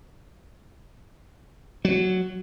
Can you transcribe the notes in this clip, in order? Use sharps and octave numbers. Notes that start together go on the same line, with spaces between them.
F#3